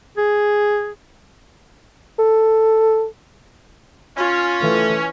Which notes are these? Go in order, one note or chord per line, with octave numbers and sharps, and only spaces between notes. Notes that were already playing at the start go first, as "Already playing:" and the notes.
G#4
A4
C#4 F4
E3 A3